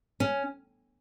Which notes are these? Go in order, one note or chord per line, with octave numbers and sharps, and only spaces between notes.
C#4